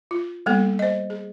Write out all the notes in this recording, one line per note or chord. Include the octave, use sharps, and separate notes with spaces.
F4
G3 A#3 B3 A4
C5 D#5
G#4